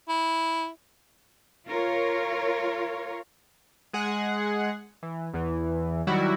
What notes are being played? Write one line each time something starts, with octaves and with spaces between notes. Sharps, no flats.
E4
F4 A#4 C#5
G#3 G#4 F#5
E3
E2 E3
D#3 F#3 G3 E4 F#4